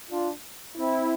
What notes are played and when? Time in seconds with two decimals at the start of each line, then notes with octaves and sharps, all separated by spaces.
0.10 D4 F4
0.77 C4 E4